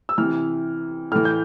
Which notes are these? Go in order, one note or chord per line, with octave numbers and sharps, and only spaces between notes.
E6
C3 E3 F6
A2 E3 F6
G6